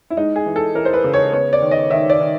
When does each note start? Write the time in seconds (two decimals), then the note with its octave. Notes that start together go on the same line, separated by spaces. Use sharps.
0.10 E4
0.17 G#3 D#4
0.36 G#4
0.46 E3
0.56 A4
0.75 E3 A#4
0.85 C5
0.93 B4
1.04 C#3
1.13 C#5
1.32 B3 C#5
1.53 D5
1.62 D#3
1.71 D#5
1.91 D#3 E5
2.10 D5
2.20 D#3